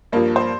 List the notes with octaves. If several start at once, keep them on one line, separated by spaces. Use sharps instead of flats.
G2 F3 A#3
C5